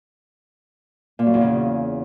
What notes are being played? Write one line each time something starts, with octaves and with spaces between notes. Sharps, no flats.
A#2
F#2
E2
C#3